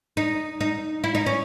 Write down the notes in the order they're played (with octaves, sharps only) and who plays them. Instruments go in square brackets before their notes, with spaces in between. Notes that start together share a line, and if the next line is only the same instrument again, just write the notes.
[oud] D#4
D#4
E4
D#4
C#4